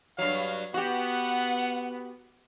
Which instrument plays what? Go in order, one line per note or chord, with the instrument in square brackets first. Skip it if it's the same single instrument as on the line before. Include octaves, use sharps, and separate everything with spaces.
[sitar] G2 F#3 [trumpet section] F5
[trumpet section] B3 [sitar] F#4 G4 [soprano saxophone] F#5